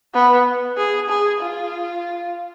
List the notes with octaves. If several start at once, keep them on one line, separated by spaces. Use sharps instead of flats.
B3
G#4
G#4
F4